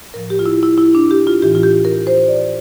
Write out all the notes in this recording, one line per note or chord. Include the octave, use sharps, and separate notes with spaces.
A2 F3 A#4
G4
F4
E4
E4
E4
D4
G4
F4
A2 E3 G4
F4
G4
A#4
C5
D5